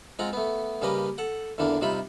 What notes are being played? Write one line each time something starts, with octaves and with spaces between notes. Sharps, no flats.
G#3 C4 F4 F#5 A#5
A3 B3
C#3 G3 A#3 G4 B4 D#5
A4 F#5
E2 D3 E3 A#3 D4
C3 G3 D#4 F4 E5 B5